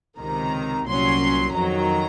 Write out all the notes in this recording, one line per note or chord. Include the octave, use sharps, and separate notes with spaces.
C#2 C3 D#3 A#5
C2 A#2 F#3 C#4 C6
F2 D#3 F#3 A#5